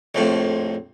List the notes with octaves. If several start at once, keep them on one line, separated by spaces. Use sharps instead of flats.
A#1 F2 A2